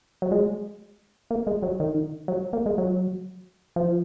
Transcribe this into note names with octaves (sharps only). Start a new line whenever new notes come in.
F#3
G#3
A#3
G#3
F#3
D#3
F#3
A#3
G#3
F#3
F3